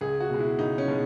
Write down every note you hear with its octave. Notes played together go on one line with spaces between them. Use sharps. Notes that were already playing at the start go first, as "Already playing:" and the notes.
C#2 G#4
F#4
B2 G#3
E4
C#2 D#4
C#4
B2 G#3